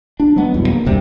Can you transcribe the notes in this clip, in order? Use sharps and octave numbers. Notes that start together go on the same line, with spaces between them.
D4
F#3 G#3 B3
E2 G2 B2
A#3
F#1 D2 C3 G3